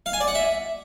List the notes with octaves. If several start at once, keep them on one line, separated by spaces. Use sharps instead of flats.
F5
G#5
D5
F#5
E5